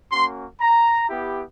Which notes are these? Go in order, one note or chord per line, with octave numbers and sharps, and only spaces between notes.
A#3 C#4 F#4 C6
A#5
B3 E4 G4